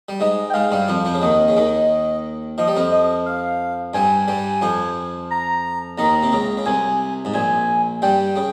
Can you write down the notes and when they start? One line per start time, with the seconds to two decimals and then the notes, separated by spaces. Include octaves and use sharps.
0.09 G3
0.20 G#2 G#3 D#5
0.50 G5
0.54 G#2 G#3 F5
0.71 G2 G3
0.88 F2 F3
1.05 F2 F3
1.14 C#3
1.22 D#2 D#3 D#5
1.48 C#3
1.57 D#2 D#3
2.58 F3 D#5
2.68 G3
2.76 F2 F3
2.92 D#5
3.26 F5
3.94 G2 G3 G#5
4.28 G2 G3
4.62 F2 F3
5.31 A#5
5.98 D#2 D#3 A#5
6.23 C3
6.32 C#2 C#3
6.57 C#3
6.66 C2 C3 G#5
7.25 G#2
7.34 A#1 A#2 G#5
8.02 G2 G3 G5
8.36 C#3